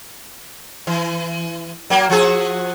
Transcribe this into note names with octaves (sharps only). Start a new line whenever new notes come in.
E3
F#3 A#3
F3 F#4 G#4